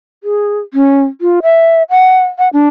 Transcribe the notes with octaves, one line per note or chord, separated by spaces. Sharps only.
G#4
C#4
F4
E5
F#5
F#5
D4